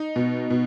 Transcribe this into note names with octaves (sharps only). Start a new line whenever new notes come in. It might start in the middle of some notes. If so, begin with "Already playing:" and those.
Already playing: D#4
B2
B2